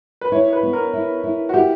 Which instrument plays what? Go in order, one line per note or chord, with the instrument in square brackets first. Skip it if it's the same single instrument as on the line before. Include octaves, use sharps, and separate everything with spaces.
[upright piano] B4
[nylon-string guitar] E4 [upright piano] C#5
[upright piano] B4
[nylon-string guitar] B3
[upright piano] A#4
[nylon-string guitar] E4
E4
[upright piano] F#4
[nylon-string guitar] E4 [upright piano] G4